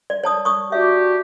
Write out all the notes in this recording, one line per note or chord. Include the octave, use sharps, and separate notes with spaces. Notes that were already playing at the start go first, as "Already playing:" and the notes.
D5
C#5 A5 D#6
C#6 D#6
D4 F#4 G4 E5